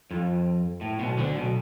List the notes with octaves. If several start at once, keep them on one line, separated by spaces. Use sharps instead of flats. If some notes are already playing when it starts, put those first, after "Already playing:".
F2
A2
B1 B2
D2 D3
B1 B2